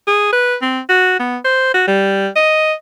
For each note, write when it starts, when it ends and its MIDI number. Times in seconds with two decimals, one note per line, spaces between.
0.07 0.31 68
0.32 0.55 71
0.62 0.80 60
0.89 1.17 66
1.19 1.37 59
1.44 1.73 72
1.74 1.84 66
1.88 2.27 55
2.36 2.73 75